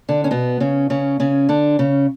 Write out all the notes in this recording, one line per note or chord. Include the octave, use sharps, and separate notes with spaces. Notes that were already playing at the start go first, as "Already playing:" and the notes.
D3 D4
C#4
B2 B3
C#3 C#4
C#3 C#4
C#3 C#4
D3 D4
C#3 C#4